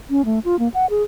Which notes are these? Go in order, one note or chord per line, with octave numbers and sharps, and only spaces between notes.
C#4
A3
F4
A#3
F#5
G#4